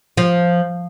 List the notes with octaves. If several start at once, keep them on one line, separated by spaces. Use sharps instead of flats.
F3